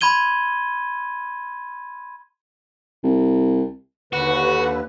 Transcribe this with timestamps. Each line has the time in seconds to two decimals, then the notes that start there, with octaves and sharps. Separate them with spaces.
0.01 B5 C6 G#6 D#7 G7
3.04 C2
4.13 D#2 D3 F#4 B4